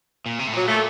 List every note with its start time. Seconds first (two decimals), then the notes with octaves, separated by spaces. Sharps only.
0.26 A#2
0.39 C3
0.47 A2
0.53 A#2 F#3
0.67 A3